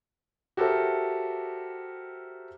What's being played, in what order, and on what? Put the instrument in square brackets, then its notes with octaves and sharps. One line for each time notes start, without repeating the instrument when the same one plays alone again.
[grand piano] F#4 G4 A4 A#4 C5 E5